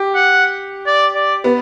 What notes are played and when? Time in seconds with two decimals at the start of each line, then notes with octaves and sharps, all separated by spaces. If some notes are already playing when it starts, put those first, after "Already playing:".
Already playing: G4
0.15 F#5
0.87 D5
1.15 D5
1.44 B3